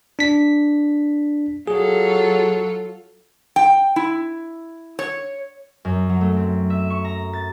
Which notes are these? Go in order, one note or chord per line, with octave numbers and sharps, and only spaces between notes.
D4 B6
F#3 F4 G#4 A4
G5
E4
C#5
F#2
F#3
A3
C4
E5
C#6
A#5
A6